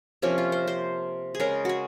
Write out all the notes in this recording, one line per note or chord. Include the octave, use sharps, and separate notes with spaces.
C3 F3 A#3 C#4
F4
C5
C5
G#4
C#3 G#3 A#4
F#4 G#4